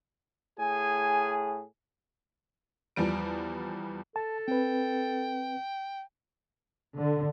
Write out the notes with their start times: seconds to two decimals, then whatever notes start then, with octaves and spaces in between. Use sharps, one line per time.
0.59 A2 G#4 G#5
2.96 E2 F3 G3 D7
4.16 A4 A5
4.48 C4 B4 G5
6.97 D3